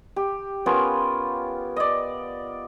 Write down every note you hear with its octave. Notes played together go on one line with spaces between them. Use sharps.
G4
B3 C#4 F4 A#4
D5 D#5